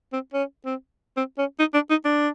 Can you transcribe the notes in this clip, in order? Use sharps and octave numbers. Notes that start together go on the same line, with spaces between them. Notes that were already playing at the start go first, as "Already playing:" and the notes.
C4
C#4
C4
C4
C#4
D#4
D4
D#4
D4